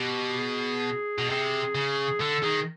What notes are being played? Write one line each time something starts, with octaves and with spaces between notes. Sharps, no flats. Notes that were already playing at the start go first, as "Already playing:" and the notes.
Already playing: B2 G4
G#4
B2
C3 G#4
C#3
D3 A4
D#3 G#4